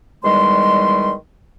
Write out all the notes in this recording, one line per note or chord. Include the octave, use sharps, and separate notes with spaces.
E2 D#3 G3 G#3 C6